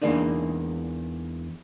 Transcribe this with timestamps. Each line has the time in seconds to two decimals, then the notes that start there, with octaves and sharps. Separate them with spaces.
0.02 E2 E3 G#3 A#3 D4 D#4